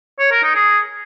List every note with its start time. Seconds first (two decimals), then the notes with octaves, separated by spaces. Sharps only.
0.19 C#5
0.31 A#4
0.43 D#4
0.55 G#4